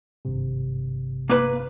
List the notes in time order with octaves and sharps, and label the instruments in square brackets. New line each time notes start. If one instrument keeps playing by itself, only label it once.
[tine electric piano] G#1 G2 C3
[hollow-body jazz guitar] A#3 B4 B5